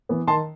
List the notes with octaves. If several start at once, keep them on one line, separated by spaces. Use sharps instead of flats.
E3 B3
D#3 A5 C6